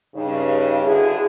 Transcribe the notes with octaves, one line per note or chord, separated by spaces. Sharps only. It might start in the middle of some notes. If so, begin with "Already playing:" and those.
G2 C#3 D#4
D3 E4 F#4 G#4